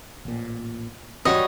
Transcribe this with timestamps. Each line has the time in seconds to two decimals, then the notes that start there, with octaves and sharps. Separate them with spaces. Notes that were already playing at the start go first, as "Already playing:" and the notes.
0.25 A1 A#2
1.25 G#1 E2 G3 F#4 C#5 D#5